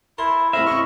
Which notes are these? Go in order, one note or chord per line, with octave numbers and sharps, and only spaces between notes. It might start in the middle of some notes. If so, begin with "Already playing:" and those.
E4 A#4 A5 C6
C2 A3 C4 E5 F5 A#5 B5
C4 C#4 E4 D#5 C#6